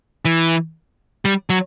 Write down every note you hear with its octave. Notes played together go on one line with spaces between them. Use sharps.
E3
G3
F#3